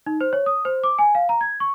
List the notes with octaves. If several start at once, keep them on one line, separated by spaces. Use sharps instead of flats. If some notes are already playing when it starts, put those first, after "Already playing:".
D#4
C5
C#5
D#6
C5
D6
G#5
F5
A#5
G#6
C#6